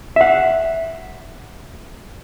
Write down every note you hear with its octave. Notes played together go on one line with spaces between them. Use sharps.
E5 F#5